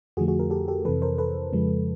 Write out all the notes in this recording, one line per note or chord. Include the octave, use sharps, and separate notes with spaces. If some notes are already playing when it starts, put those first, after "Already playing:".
F2 D3 F3 A3 F#4 G#4
F#4 G#4
G#4 A#4
G4 A4
G4 A4
F2 C3 E3 A4 B4
A#4 C5
A4 B4
F2 C#3 F3 G#3